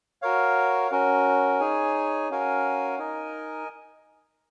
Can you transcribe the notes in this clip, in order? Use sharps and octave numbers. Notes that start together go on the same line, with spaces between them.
F#4 A#4 C#5 F5
C#4 F#4 A#4
D#4 G#4 C#5 G#5
C#4 F#4 A#4 F5 G#5
D#4 A#4 D#5 G#5